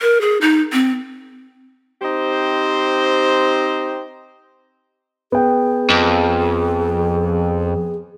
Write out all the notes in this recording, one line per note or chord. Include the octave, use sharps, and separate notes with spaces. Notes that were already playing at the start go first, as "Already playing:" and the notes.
A#4
G#4
D#4
C4
C4 D#4 G4 C5
B3 G#4 G5
F2